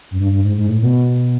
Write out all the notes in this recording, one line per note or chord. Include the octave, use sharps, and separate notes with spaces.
F#2
G2
G2
G#2
G#2
A2
B2